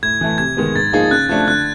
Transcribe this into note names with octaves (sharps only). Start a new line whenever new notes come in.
A2 G#6
E3 A3
C3 G#6
D#3 G#3 B3
G#2 A6
F3 A#3 D#4 G#4
C#3 F#6
F3 A3 D4
D3 F#6